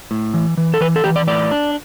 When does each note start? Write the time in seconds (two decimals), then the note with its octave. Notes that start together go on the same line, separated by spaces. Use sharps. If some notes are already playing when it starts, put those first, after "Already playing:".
0.11 A2
0.34 E3
0.57 E3
0.74 A4
0.81 E3 B4
0.96 A4
1.04 E3 G4
1.16 D5
1.27 A2 D5
1.52 D4